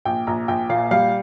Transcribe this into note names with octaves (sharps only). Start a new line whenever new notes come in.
A#1 G5
A#1 A#5
A#1 G5
A#2 F5
G3 F5